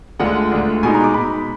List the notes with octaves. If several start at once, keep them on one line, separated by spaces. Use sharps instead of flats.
D2 D3 G#3 D4 F4 F#5
D2 D3 G#3 D4 F4
B2 G#3 D#4 G#5
A#5
D6
B2 G#3 D#4 B5